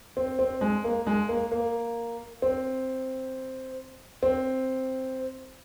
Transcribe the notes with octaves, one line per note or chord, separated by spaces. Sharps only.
C4
C4
G#3
A#3
G#3
A#3
A#3
C4
C4